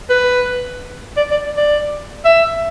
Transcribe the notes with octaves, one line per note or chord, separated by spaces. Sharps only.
B4
D5
D5
D5
E5